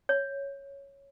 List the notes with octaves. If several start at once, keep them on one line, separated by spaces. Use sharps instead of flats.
C#5